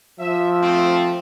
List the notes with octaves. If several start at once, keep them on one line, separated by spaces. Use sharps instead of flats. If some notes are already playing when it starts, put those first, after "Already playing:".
F3 E5
A3 C4